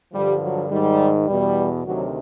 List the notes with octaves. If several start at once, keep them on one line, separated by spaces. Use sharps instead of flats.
G2 D3 F3 G3
F#3
G#2 D#3 G3
E2 B2 G3
D2 C3 D#3 F#3